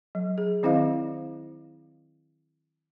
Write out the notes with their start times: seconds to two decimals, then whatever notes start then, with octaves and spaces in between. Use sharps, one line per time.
0.15 F#3
0.38 G#4
0.63 D#3 C4 E4 C5 D#5 F5